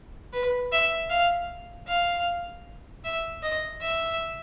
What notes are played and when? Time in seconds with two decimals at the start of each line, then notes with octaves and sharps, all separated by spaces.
0.33 B4
0.72 E5
1.10 F5
1.87 F5
3.04 E5
3.42 D#5
3.81 E5